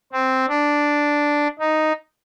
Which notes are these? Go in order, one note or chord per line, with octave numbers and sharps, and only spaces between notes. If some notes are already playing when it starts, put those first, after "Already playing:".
C4
D4
D#4